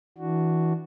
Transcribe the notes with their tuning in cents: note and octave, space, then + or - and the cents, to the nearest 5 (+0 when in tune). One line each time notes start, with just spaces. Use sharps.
E3 -20 D4 +0 F#4 +0